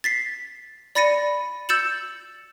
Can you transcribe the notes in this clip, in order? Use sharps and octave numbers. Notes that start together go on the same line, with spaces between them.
A6 B6 C7
D5 B5 A6 A#6 C#7 D#7
E6 G6 A6 C#7 E7 F#7